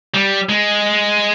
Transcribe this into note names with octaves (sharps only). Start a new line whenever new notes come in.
G3
G#3